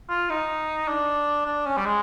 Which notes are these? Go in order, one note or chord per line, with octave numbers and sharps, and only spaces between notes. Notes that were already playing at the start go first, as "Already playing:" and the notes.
F4
D#4
D4
D4
C#4
G3
G#3